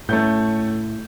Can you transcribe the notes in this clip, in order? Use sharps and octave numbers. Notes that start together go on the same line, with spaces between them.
A2 A3 C#4 G6